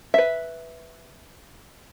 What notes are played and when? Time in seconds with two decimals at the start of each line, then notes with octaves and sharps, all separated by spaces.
0.14 B4 E5